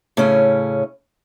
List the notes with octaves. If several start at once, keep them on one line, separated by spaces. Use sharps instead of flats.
A2 C#3 C#4